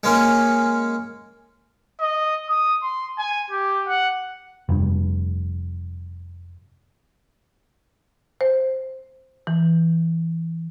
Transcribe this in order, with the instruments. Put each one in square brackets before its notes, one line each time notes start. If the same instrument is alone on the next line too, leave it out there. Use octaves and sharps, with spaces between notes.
[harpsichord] G#3 A#3 C#4
[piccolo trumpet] D#5
D#6
C6
G#5
G4
F#5
[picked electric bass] F1 G2
[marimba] C5
E3